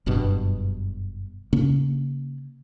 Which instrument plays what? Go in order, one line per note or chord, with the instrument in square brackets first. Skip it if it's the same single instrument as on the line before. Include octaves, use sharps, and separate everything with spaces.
[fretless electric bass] F#1 G2 B2
C#3 A#3 C#4